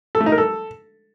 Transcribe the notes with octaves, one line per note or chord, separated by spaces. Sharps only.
A4
A3
D#4
A#4
A4